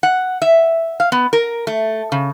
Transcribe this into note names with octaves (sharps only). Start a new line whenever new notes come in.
F#5
E5
F5
B3
A#4
A3
C#3